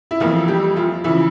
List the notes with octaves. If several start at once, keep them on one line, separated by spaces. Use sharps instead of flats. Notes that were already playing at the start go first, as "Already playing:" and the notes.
E4
F2 E3 F3 A#3 F4
G3 G4
F3 F4
C#3 E3 F3 E4